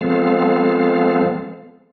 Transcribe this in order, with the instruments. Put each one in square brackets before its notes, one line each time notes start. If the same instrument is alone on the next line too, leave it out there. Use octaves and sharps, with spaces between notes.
[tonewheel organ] F3 G#3 B3 C4 A4 F5